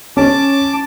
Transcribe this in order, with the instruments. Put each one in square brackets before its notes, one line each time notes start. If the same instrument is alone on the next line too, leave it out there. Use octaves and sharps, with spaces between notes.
[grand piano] C#4 [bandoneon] A5 D6